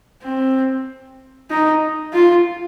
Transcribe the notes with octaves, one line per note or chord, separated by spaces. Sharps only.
C4
D#4
F4